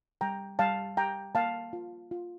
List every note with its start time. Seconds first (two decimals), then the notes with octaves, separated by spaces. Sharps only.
0.21 G3 G5 A#5
0.59 G3 F5 A5
0.97 G4 G5 A#5
1.35 A#3 F5 A5
1.73 F4
2.11 F4